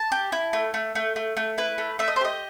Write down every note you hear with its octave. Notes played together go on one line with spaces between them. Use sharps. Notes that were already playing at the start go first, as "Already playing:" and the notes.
Already playing: A5
G4
E4
A3
A3
A3
A3
A3
E4 B4
A3
A3 E5
D#5
C5
G4 D#5